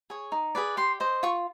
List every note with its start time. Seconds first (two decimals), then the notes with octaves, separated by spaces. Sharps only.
0.10 G#4 C#5
0.32 D#4
0.55 G#4 B4 D5
0.77 G4 C6
1.00 C5 D#5
1.23 F4 C#6